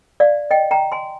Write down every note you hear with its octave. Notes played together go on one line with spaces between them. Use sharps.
D5 F5
D#5 G5
G5 A#5
G#5 C6